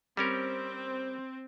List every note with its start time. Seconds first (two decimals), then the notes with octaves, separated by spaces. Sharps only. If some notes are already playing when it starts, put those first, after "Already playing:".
0.17 G3 C4 C#4 A#4